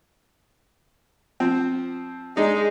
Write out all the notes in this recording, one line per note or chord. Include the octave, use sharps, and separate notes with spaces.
F3 C4
G#3 D4 D#4